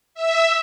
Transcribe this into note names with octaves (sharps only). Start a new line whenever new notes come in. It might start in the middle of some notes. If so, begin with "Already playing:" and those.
E5